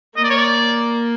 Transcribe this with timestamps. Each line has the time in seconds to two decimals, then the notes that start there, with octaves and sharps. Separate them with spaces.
0.16 A#3 D#5
0.24 D5
0.30 C#5
0.37 D5